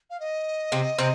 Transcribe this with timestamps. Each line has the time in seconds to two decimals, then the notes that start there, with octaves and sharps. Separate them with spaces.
0.10 F5
0.20 D#5
0.72 C3 C4
0.99 C3 C4